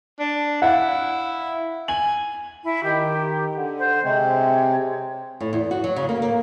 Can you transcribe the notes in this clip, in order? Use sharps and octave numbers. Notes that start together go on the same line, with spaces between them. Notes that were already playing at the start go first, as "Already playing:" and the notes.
D4
E4 F5 F#5
G#5 F#7
E4
D#3 G4
D3
C5
C3 G#3 C4 C#5
A2
E2
F#4
F#3
C#3
A#3
A#3